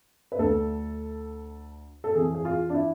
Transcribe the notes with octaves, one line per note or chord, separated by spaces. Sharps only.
B4
D2 D3 A4
A4
F2 E3 G#4
G#4
F4
D4
E4